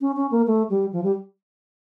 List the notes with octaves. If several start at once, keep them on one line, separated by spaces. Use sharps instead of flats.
C#4
C#4
A#3
A3
G3
F3
G3